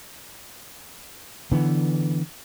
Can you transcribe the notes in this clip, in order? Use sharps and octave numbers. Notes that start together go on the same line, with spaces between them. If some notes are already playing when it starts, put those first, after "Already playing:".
D3 E3 B3